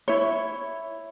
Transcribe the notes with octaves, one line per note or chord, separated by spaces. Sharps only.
E4 C#5